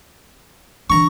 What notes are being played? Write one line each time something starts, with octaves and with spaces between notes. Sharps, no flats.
E3 D4 A#5 C#6